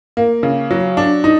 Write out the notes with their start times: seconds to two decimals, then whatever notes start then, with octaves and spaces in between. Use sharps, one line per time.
0.17 A#3
0.43 C#3
0.71 F#3
0.97 D4
1.24 D#4